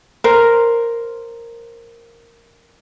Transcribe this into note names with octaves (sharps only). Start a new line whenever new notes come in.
A#4 C5